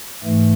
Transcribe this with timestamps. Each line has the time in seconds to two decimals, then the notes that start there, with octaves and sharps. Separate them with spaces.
0.23 G#2 E3 A3